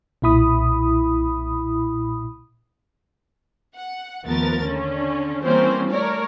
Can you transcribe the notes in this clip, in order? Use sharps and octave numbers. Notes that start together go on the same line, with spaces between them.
B1 A#2 E4 B5 D#6
F#5
D#2 F3 A3 B3 A#4 A6
D3 C#4
E3 G3 A#3 C4 C#4 C5
A3 A#4 C#5 D5